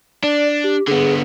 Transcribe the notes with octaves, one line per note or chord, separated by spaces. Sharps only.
D4 D5
G4
D3 B3 G#4